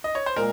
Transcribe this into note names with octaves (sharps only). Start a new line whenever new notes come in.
D#5
C#5
C5
A#2 G#3 A#4